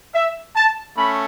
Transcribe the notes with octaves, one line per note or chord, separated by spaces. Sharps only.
E5
A5
A3 C#4 B5